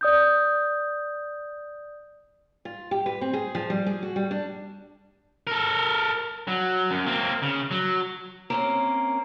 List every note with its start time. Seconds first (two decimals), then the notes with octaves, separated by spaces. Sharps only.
0.01 D5 D#6 G6
2.65 F4
2.91 G4
3.06 B4
3.21 C4
3.33 G#4
3.55 F3
3.70 G3
3.86 G#4
4.03 F#4
4.16 G3
4.31 D4
5.47 A4 A#4
6.48 F#3
6.91 F#2
7.06 A#3 C4
7.42 C#3
7.71 F#3
8.50 A#3 C4 C#4